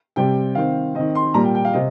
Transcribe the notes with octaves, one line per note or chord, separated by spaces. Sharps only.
C3 G3 C4 G5
D#3 C4 F5
D#3 C4 D#5
C6
A#2 G3 A#3 A#5
G5
G5
F5
C3 D#5